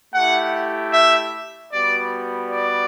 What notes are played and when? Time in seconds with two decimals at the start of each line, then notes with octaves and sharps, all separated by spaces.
0.14 A3 E4 G4 F#5
0.93 E5
1.72 G3 B3 F#4 D5
2.51 D5